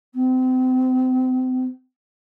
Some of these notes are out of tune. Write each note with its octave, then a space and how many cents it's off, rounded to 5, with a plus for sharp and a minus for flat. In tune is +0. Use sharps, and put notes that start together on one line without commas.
C4 -35